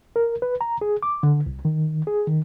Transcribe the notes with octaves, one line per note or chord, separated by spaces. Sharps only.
A#4
B4
A#5
G#4
D6
D3
C2
D#3
G#4
D#3